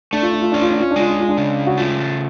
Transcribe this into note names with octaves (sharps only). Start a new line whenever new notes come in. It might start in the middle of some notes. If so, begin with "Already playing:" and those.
A3 D4
F4
D4
F4
C#4 D4
F4
D4
F4
D4
G#3 F4
D4
F4
D4
C#3
F#4
A3 F4